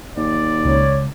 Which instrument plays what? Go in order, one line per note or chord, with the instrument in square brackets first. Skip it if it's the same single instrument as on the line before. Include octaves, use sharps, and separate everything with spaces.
[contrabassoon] D#2 [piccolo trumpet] D5
[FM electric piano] C#2 [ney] C#5